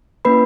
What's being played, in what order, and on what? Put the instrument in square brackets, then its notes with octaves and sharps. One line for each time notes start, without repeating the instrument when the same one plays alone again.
[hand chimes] A#3 C#4 E4 B4 B5